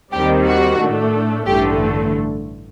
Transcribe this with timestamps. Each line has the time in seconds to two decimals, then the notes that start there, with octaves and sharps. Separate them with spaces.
0.12 D#2 D#3 G3 C4 G4
0.47 F#4
0.80 A2 A3 D4
1.47 A1 G2 D3 A3 G4